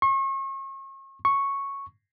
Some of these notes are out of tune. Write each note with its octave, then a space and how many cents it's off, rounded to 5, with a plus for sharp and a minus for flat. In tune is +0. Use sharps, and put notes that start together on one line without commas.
C#6 -40
C#6 -5